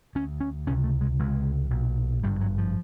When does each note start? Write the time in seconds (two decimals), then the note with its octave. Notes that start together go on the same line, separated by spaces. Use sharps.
0.15 D2 D3 C#4
0.40 C#4
0.67 C#2 C#4
0.70 C3
0.84 A3
1.01 G#3
1.19 C#2 C3 G#3
1.70 B1 A#2
2.23 G#1 G2 D3 G3
2.41 F#3
2.58 F3